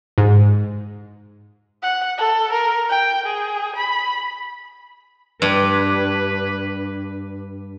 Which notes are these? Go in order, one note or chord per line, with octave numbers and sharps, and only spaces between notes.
G#2
F#5
A4
A#4
G5
G#4
B5
G2 B4